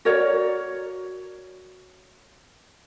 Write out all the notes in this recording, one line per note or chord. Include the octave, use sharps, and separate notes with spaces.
F#4 A#4 C#5 D5